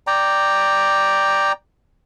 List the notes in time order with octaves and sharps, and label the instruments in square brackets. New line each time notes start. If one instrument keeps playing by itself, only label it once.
[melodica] D5 G5 A#5